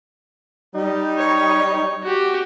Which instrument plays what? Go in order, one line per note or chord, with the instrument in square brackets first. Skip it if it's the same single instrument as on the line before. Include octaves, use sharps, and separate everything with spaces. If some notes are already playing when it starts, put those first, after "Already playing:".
[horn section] G3 D#4
[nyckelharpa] C#5
F#4 G4